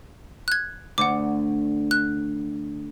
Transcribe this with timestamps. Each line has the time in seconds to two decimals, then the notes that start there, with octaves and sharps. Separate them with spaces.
0.48 F#6 G#6
0.98 D2 F#5 D6
1.91 F#6